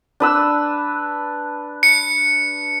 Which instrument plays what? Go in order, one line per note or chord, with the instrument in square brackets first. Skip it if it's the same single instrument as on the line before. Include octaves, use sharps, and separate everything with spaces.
[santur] D4 B4 E6
[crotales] C#7